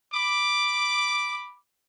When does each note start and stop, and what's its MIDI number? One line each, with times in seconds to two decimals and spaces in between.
0.13 1.55 83
0.13 1.55 86